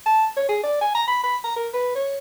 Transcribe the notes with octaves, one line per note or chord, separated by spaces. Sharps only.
A5
C#5
G#4
D5
G#5
A#5
B5
B5
A#5
A#4
B4
C#5